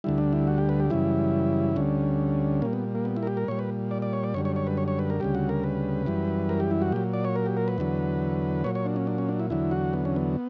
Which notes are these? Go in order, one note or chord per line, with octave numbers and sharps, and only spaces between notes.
D2 D3 G3 E4
D4
E4
F#4
G4
B4
G4
F#2 C#3 E3 G3 E4
D2 D3 G3 C#4
A#2 G3 A#3
B3
A#3
B3
E4
A#4
G4
A#4
A#2 G3 C#5
B4
D5
D5
C#5
D5
F#2 D3 G3 C#5
C#5
C#5
B4
C#5
C#5
B4
A#4
D2 C#3 G3 G4
F#4
A#4
B4
F#2 E3 G3
A#4
G4
E4
F#4
A#2 F#3 G4
D5
C#5
A#4
G4
A#4
B4
E2 D3 F#3
A#2 F#3 C#5
C#5
D4
C#4
D4
C#4
D4
E4
E2 D3 F#3 E4
F#4
B3
C#4
B3